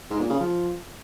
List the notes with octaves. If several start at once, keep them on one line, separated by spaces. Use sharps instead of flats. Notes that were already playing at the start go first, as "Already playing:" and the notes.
G#2
A#2
C#3
F3